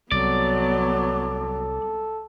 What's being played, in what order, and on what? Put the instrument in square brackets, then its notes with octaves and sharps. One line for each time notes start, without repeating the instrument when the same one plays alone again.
[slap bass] C2 [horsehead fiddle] F#3 B3 [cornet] A4 [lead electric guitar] D5